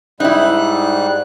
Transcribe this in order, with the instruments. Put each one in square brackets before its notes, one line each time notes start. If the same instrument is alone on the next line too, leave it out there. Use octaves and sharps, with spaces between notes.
[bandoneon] G#2 G3 F#6 [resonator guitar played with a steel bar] D#4 E4